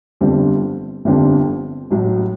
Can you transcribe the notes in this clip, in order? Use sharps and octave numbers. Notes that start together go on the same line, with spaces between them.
G1 F2 D3 G3 C4
G1 F2 D3 G3 C4
A1 A2 F#3